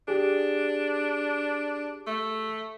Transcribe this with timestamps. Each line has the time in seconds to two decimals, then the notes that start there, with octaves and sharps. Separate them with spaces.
0.08 D4 G4 G#4
2.07 A3